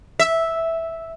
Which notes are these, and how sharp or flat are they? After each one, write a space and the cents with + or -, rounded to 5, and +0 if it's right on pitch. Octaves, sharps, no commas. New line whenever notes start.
E5 -5